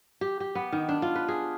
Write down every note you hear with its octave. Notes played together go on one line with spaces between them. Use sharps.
G4
G4
B3
D#3
D4
F4
B4
G#4